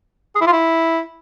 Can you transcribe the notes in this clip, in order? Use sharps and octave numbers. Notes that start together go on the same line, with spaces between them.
G#4
E4
F4
E4